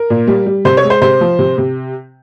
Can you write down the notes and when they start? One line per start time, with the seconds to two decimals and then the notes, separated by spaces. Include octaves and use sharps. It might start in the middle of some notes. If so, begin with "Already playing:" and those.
Already playing: A#4
0.10 A#2
0.27 G3
0.46 G3
0.65 C3 C5
0.77 C#5
0.84 G#3
0.90 C5
1.02 C3 C5
1.21 F3
1.39 C3
1.58 C3